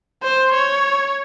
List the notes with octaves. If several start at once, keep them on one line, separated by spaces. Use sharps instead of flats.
C5
C#5